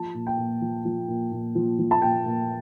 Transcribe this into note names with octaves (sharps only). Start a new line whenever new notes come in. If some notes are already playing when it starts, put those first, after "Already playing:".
Already playing: F3 A5
A#2
G5
A#2
F3
F3
A#2
A#2
F3
F3
A5
A#2 G5
A#2